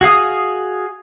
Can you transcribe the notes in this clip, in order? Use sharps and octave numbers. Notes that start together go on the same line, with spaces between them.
F#4 G#4 F5 D#6